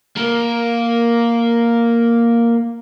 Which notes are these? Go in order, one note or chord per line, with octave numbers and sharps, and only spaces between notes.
A#3